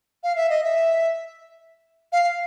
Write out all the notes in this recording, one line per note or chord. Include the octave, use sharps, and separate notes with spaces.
F5
E5
D#5
E5
F5